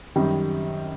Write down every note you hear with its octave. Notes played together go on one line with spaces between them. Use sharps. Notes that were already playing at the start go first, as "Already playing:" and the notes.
F#2 D#3 G3